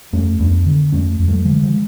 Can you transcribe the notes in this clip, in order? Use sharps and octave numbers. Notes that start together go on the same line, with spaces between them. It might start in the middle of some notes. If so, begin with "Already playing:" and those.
F2 A3 C#4
F2 B3 D4
D3
F2 A3 C#4
F2
F#3 A3
D3 F3 G#3
F3 G#3